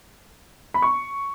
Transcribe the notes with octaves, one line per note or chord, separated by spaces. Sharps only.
B5
C#6